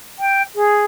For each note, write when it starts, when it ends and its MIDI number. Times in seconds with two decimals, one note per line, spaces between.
0.19 0.42 79
0.55 0.85 68